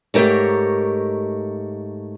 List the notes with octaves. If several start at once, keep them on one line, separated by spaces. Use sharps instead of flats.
G#2 A3 G4 A#4 C#5